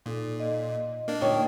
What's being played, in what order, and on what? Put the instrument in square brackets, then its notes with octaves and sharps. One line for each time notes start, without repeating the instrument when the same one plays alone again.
[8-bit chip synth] A#2 [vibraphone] D#4 A4
[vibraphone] D#5
[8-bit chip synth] A#3 D4
[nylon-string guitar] D2 A#2 C#5 [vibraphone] D#4 G5